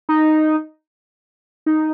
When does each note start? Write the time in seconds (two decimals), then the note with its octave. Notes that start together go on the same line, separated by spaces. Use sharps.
0.09 D#4
1.66 D#4